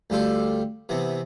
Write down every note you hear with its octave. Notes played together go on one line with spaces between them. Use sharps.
D2 G3 F4 G4 A4 C6
C3 E3 B3